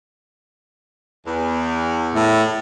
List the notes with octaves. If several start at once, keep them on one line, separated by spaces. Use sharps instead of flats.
E2
A2